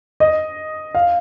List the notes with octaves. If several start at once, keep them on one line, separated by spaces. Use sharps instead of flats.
D#5
F5